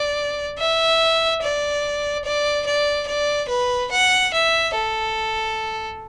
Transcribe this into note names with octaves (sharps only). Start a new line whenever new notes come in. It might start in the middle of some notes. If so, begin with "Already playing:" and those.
Already playing: D5
E5
D5
D5
D5
D5
B4
F#5
E5
A4